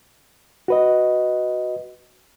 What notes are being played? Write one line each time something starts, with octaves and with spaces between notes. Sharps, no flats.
F#4 B4 D#5